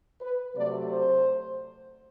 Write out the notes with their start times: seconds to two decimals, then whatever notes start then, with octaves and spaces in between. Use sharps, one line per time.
0.21 B4
0.55 C3 F#3 A3 D5
0.89 C5